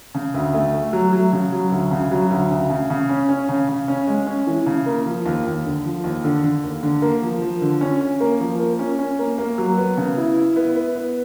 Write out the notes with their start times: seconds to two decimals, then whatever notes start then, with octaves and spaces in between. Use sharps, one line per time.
0.14 C#3
0.34 D2
0.54 A3
0.74 A3
0.93 F#3
1.13 F#3
1.32 C#3
1.52 F#3
1.72 D2
1.91 C#3
2.11 F#3
2.31 D2
2.50 C#3
2.70 C#3
2.90 C#3
3.09 C#4
3.29 C#4
3.49 C#3
3.69 C#3
3.88 C#4
4.07 G#3
4.27 C#4
4.47 E3
4.66 C#3
4.86 A#3
5.06 F3
5.26 D#2
5.45 D#2
5.65 D3
5.84 F3
6.04 D#2
6.24 D3
6.44 D3
6.64 D#2
6.83 D3
7.02 A#3
7.22 F3
7.42 F3
7.62 D3
7.81 C#4
8.01 C#4
8.20 A#3
8.40 F3
8.60 A#3
8.79 C#4
8.99 C#4
9.19 A#3
9.38 A#3
9.58 F#3
9.78 B3
9.97 C#3
10.17 E4
10.37 E4
10.56 B3
10.75 B3
10.96 B3